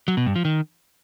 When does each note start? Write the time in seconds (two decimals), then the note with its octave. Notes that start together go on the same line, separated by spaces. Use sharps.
0.08 F#3
0.17 B2
0.26 G2
0.36 F3
0.45 D#3